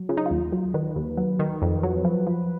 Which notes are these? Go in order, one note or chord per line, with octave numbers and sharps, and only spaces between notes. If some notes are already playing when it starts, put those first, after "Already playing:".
Already playing: F#3
C#3 F4
D#4
F4
D#2
F#3
D#3 B4
D#2
F#3
D#3
F2
F#3
F3
F3